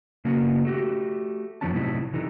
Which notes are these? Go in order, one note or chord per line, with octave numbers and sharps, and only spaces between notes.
C#3 A#3 B3 C#4 F#4
A3 F#4 G4
F2 D#3 F3 B3 C#4 A5
A2 C3 F#3 D#4 E4
C3 E3 D#4 A4